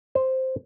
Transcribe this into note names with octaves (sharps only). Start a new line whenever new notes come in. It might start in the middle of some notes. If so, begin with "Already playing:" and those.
C5